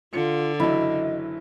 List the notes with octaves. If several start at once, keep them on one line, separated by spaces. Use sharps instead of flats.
D3 F4 C#7
F#1 E3 F#3 E4 D#5